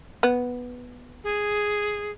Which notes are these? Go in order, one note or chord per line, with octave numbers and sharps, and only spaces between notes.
B3
G#4